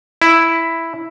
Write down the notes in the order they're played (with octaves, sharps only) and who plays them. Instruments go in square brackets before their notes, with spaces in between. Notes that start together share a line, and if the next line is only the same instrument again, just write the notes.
[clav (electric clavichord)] E4